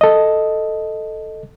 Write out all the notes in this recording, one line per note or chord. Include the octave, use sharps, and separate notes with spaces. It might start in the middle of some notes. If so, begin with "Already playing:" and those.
A4 D#5